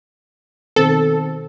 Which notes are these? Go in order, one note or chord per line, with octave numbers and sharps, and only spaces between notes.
B2 D#3 C4 A4